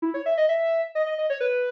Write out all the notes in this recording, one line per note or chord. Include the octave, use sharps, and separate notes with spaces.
E4
C#5
E5
D#5
E5
D#5
D#5
D#5
C#5
B4